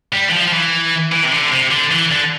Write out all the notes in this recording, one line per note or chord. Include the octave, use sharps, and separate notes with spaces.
G3
E3
F3
F3
E3
E3
C3
D3
C3
D3
E3
D3